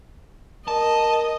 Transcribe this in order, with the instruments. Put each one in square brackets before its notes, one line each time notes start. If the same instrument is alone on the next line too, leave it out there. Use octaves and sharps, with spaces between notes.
[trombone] A#4 [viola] D#5 [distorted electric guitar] A5